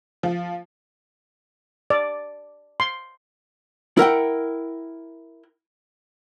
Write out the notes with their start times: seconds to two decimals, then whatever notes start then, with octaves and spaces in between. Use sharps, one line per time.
0.23 F3
1.90 D5
2.80 C6
3.97 E4 A#4 F#5 G5